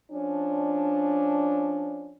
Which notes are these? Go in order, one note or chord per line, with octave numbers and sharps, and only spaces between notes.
F3 C#4 D4